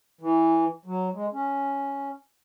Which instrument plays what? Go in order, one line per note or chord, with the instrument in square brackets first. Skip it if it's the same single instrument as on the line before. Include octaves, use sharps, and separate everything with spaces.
[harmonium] E3
F#3
G#3
C#4